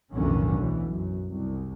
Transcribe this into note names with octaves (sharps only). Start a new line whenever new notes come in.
B1 F2 A2 D3 D#3 C#4
D2 B2 E3
F#2
C2